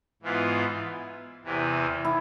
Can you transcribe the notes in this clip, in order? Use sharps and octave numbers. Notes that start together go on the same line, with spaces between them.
G#2 E3 B3 F4
E2 C3 E3
E4